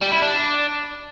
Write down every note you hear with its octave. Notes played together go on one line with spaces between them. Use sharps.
G3
E4
D4